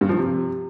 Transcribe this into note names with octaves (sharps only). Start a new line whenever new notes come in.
G2
F3
C3